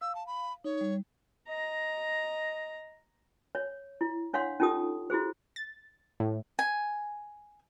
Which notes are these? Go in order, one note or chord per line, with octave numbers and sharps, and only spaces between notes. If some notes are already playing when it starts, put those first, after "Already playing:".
F5 E6
A5
B5
D#4 C#5
G3
D#5 A#5
C#5
E4
D4 C#5 F5 F#5 C6
C#4 D#4 F4 G4 A4 D#6
E4 F#4 G#4 C5
A6
A2
G#5